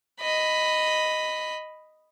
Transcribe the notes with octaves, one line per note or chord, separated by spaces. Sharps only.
D#5 B5